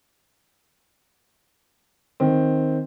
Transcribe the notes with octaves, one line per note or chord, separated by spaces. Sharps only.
D#3 C4